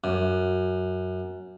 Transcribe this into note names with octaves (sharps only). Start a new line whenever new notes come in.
F#2